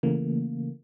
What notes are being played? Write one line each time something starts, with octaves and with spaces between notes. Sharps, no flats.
C#3 E3 A3 A#3